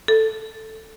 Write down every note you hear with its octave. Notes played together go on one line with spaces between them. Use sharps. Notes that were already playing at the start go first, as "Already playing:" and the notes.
A4